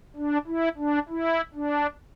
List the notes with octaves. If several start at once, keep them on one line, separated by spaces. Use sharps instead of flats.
D4
E4
D4
E4
D4